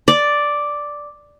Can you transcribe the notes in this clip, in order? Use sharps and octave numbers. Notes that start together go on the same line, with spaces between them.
D5